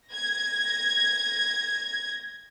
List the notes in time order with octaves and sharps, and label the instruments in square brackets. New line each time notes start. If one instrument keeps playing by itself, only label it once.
[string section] G#6 A#6